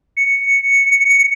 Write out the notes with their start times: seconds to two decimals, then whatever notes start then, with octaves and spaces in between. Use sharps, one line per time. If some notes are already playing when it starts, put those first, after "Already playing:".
0.17 C#7